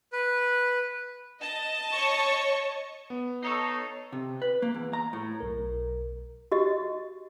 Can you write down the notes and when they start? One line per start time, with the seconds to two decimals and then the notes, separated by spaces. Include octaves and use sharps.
0.13 B4
1.41 D#5 A5
1.92 C#5 C#6
3.10 B3
3.43 D#4 A4 C#5 C7
4.13 C3
4.42 B4
4.62 A#3
4.74 E2
4.93 A#5
5.13 A2
5.40 B1 A#4
6.52 F#4 G4 D#5